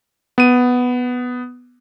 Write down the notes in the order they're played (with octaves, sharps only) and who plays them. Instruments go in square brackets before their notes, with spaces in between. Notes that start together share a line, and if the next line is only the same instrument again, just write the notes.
[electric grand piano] B3 D#7